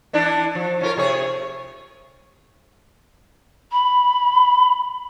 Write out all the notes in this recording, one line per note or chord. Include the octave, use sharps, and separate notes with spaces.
E3 D4 E4
F3
C#4 F4 A#4
C3 G#4 C#5
B5